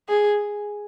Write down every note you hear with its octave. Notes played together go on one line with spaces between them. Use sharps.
G#4